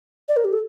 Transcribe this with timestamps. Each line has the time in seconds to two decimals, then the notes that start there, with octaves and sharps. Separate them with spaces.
0.29 D5
0.37 A#4
0.45 G4
0.53 A4